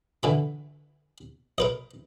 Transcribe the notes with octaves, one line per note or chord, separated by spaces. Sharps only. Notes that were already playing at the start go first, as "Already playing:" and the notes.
D3 E3 B5
A#4 B4 D#5